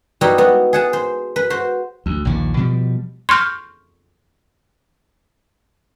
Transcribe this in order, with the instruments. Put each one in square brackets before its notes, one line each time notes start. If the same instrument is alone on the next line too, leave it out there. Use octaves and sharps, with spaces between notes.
[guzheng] G3 B3 D#4 E4 F#4
B3 F#4
G#4 F#5 A5
C5
B4
F#4 C5
[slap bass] D2
A#1 D#2 A#2
B2 F3 G3
[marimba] C6 C#6 F6 G6